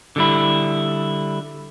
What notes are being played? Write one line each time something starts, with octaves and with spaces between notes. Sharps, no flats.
D3 G3 E4